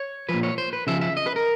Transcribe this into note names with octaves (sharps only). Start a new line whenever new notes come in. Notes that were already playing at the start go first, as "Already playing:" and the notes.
Already playing: C#5
F3 B4
A#2
C#5
C5
B4
C#3 F3 E5
E5
D#5
B4
A#4